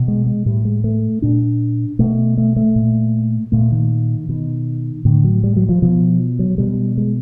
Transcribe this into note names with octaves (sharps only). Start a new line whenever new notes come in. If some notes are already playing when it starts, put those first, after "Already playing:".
Already playing: B2
G#3
G#3
A2 G3
G#3
A3
A#2 D4
B2 A3
A3
A3
A#2
A#2 A3
D#3
B2 D#3
A2 D3
F#3
G3
F#3
F3
B2 F3
F#3
B2 G3
G#3